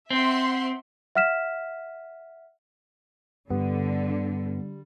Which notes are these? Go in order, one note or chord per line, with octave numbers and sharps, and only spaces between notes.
C4 E5 F#5 C6
E5 F#5 F6 B6 E7
G2 D3 G3 B3